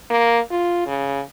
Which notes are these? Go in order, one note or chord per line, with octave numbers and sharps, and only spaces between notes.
A#3
F4
C#3